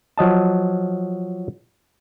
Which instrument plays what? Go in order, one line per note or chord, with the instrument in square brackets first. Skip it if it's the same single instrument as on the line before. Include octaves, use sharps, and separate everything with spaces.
[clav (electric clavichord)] F3 F#3 D#5 A5